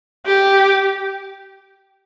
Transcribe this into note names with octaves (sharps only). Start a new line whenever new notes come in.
G4